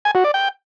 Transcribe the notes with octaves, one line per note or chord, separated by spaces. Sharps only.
G#5
F#4
D5
G5